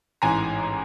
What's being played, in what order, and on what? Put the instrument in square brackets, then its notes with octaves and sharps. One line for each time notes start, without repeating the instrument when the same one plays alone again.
[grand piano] A1 G#2 E3 G#5 A#5